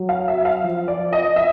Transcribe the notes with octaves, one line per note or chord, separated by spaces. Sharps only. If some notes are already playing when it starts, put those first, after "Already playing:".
Already playing: F#3
F5
E5
F5
F3
D5
F3
D#5
E5